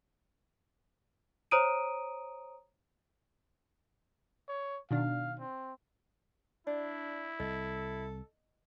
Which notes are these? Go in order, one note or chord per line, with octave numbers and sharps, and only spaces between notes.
C5 C#5 A#5 D#6 D7 D#7
C#5
B2 D#3 D4 F5
C4
D4 E4 D5
C2 A4 D#5